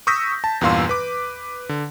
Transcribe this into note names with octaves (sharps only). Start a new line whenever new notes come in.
C#6 D#6 E6 G6 A#6 B6
A5
E2 G2 A#2 F5 C6 E6
B4 D6
D3